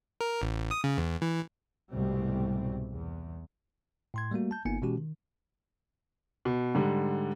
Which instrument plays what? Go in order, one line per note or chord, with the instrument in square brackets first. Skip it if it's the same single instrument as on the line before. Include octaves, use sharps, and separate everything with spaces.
[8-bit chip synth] A#4
A1
D#6
C#3
E2
E3
[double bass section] C2 G#2 B2 G3 A3 C4
E2
[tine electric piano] A2 C6 G#6
G3 A3 A#3 F#4
A5 G6
G1 A#3 B3 D#4 G#5 C#7
B2 E3 G#3 C#4 F#4 G4
D#3
[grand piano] B2
G#2 D3 G3